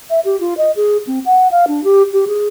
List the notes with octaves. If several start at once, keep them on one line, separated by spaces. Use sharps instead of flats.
E5
G4
F4
D#5
G#4
C4
F#5
F5
D4
G4
G4
G#4